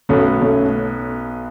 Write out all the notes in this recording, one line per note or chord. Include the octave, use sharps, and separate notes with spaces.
B1 B2 A3 B3 C#4
A3 C#4